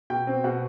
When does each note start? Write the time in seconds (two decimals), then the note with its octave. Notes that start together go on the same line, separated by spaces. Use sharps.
0.10 B2 G5
0.27 C4
0.44 B2 F#5